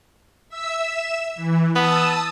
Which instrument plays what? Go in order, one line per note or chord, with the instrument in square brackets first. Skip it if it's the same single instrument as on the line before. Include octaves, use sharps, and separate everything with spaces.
[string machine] E5 E6
E3
[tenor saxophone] B3 [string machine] A5 D#6 E6